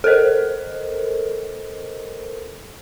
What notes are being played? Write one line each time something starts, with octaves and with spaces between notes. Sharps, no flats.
A4 A#4 C5 D#5